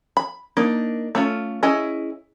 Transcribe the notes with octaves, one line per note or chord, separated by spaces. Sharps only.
B5
A#3 D4 D#4
A3 C#4 F4
C#4 E4 G#4 D#5